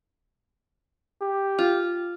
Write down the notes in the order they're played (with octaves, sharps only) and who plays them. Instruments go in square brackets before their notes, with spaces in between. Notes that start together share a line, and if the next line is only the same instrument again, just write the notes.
[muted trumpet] G4
[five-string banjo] F4